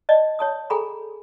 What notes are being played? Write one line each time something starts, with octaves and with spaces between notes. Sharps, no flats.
D5 D#5 A5
C#5 A5 D#6
G#4 A4 G5 G#5 A#5 B5